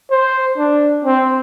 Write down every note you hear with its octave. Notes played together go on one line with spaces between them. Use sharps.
C5
D4
C4